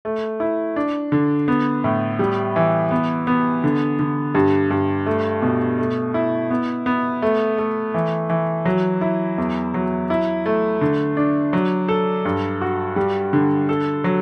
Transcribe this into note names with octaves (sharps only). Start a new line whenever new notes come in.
A3
E4
D4
D3
B3
A2
G3
E3
B3
B3
D3
D3
G2
G2
A3
B2
A3
E4
B3
B3
A3
A3
E3
E3
F#3
E4
E2
F#3
E4
A3
D3
D4
F#3
A4
G2
F#4
G3
D3
A4
F#3